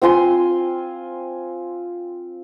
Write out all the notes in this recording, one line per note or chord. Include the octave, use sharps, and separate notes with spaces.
C4 F4 G#5 C6